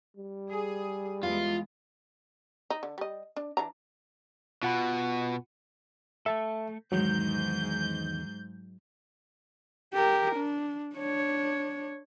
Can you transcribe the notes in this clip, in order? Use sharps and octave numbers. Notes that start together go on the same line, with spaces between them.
G3
G#4
E2 G#3 F4
D#4
D3
G3 D#5
D4
E3 D4 A#5
B2 F4 F#5 B5
A3 A4 E5 A5
E2 G#2 D#3 F#3 G#3 G6
G4 A#4
D4
D4 C#5